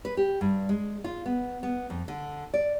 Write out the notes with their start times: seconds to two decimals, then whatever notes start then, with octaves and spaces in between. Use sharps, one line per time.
0.05 B4
0.17 G4
0.41 G2
0.69 G#3
1.04 F4
1.26 B3
1.63 B3
1.90 F2
2.08 D3
2.54 D5